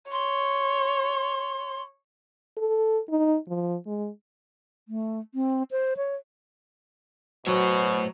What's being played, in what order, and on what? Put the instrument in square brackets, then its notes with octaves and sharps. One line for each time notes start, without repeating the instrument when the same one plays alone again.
[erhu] C#5 [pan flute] C6
[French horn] A4
D#4
F3
G#3
[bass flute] A3
C4
C5
C#5
[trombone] B2 [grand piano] F#3 [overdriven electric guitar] A3 C#5 [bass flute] C5